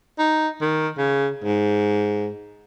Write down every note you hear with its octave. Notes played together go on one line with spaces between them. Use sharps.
D#4
D#3
C#3
G#2